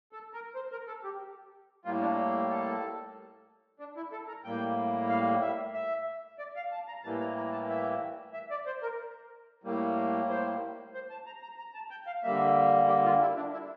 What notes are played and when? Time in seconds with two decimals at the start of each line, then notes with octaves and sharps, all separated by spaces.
0.12 A4
0.34 A#4
0.55 C5
0.72 A#4
0.88 A4
1.04 G4
1.85 A2 G3 A#3 F4
2.02 D4
2.50 A4
3.79 D4
3.97 E4
4.12 A4
4.28 A#4
4.44 A2 G3 A#3 G5
5.09 F5
5.42 E5
5.74 E5
6.39 D5
6.56 F5
6.72 A5
6.88 A#5
7.04 A2 E3 G3 A#3 A5
7.21 A#5
7.37 A#5
7.53 A5
7.69 E5
8.34 E5
8.51 D5
8.67 C5
8.83 A#4
9.64 A2 G3 A#3
10.29 C5
10.94 C5
11.10 A5
11.26 A#5
11.42 A#5
11.58 A#5
11.75 A5
11.91 G5
12.07 F5
12.23 D3 G3 A#3 E5
12.88 G4
13.05 F4
13.21 E4
13.36 D4
13.53 E4